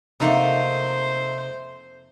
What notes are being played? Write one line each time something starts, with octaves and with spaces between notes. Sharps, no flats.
F2 C3 A3 A#3 D#4 C5 F#5